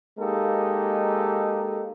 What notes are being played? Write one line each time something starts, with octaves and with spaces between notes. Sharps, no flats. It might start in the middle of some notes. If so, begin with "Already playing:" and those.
G#3 A#3 D#4 G4 A4